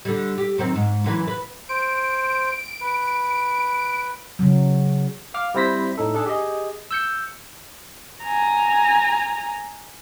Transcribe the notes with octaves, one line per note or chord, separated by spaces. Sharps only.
D3 G3
G4
F#2 D#3 C4
G#2
F#2 E3 B4
B4
C5 D7
B4
C#3 F#3
F5 D6 F6
G3 C4 E4 C5 A#6 B6
A2 D#4 A4
D4 G#4 A4
G4 G#4 D#5
E6 G6 C#7
G#5 A#5